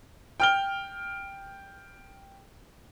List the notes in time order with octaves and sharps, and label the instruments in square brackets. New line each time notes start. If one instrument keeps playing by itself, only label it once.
[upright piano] G5 F6 G7